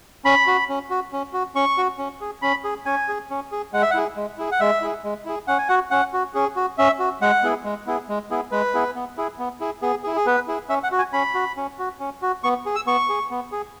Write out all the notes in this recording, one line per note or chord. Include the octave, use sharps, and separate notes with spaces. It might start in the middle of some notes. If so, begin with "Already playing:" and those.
C#4 B5
F#4
C#4
F#4
C#4
F#4
C#4 C#6
F#4
C#4
G#4
C#4 B5
G#4
C#4 G#5
G#4
C#4
G#4
G#3 F#5
E5
F#5
E4 G#4
G#3
E4 G#4
F#5
G#3 E5
E4 G#4
G#3
E4 G#4
C#4 F#5
G#5
F#4 F#5
C#4 F#5
F#4
C#4 G#4
F#4
C#4 E5
F#4
G#3 F#5
B3 E4 G#4
G#3
B3 E4 G#4
G#3
B3 E4 G#4
G#3 B4
B3 E4 G#4
B3
E4 G#4
B3
E4 G#4
B3 G#4
E4 G#4
G#4
B3 B4
E4 G#4
C#4 E5
F#5
F#4
G#5
C#4 B5
F#4
C#4
F#4
C#4
F#4
B3 C#6
G#4
E6
B3 C#6
G#4
B3
G#4